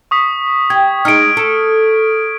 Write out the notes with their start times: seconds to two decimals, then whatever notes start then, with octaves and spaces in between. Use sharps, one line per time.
0.11 C#6 D#6 B6
0.70 G4 G#6
1.05 G#3 D#4 F6 D7
1.37 A4